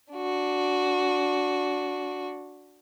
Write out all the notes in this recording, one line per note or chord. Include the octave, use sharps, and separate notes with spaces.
D4 F#4